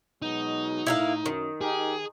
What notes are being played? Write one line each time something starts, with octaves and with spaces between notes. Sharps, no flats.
B2 F#3 G#3 D#4
A2 E4 A#4 F5
F#2 D#3
D#4 G4 G#4 A#4